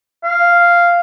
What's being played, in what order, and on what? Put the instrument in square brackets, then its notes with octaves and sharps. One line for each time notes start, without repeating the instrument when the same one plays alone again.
[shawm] F5